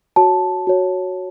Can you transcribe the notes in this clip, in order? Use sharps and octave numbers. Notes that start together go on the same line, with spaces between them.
F#4 C#5 A5
F#4 C#5